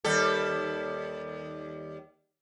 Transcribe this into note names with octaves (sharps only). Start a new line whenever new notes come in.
D#2 G3 A4